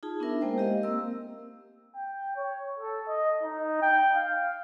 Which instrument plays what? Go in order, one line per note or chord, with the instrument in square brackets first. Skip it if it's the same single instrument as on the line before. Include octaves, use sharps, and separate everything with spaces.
[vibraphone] D#4 F4 G#4 A5
B3 D4 E4 A#4 E5
G#3 A#3 A#4 C5 G5
G4 D#5 F5
A#3 C4 A#4 E6
[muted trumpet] G5
C#5
A4
D#5
D#4
G5
F5